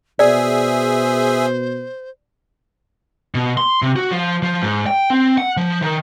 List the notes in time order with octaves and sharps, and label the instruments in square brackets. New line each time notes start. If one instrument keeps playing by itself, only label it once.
[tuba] B2 [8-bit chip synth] G#4 E5 [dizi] C5 [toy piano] D5
[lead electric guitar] B2
C6
C3
F#4
F3
F3
G#2
G5
C4
F#5
F3
D#3